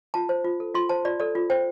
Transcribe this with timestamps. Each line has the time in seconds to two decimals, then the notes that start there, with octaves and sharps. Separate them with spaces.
0.14 F4 A5
0.29 C5
0.44 F4
0.60 A4
0.75 F4 C6
0.89 C5 A5
1.05 F4 D5
1.20 A4 D5
1.35 F4
1.50 C5 G5